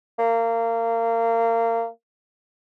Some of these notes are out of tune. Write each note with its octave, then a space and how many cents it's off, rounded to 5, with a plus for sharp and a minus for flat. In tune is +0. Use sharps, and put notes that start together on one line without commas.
A#3 -25